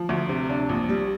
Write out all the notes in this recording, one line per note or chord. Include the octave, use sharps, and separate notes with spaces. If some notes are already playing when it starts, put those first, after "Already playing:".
Already playing: F3
D2
C3
D4
A#1
G3